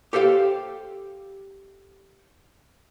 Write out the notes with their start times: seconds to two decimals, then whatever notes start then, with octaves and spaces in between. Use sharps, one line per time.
0.13 G4 A4 C5 F5 G5